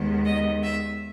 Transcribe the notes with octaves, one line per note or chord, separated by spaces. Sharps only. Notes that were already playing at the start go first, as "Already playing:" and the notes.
Already playing: D#2 D#3 G#3 B3
D#5
E5